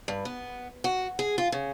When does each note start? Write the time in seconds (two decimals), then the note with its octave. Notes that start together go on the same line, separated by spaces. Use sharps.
0.08 G2
0.25 B3
0.84 F#4
1.19 G#4
1.38 F4
1.52 C#3